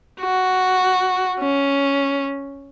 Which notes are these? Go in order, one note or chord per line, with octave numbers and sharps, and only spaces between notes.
F#4
C#4